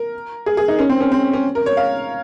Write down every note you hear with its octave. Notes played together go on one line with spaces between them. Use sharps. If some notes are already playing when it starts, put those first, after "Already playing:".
Already playing: A#4
G#4
G#4
D#4
C#4
C4
C#4
C4
C#4
A#4
C#5
F5